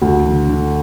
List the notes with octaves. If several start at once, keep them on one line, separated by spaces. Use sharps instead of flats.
D2
D3
D3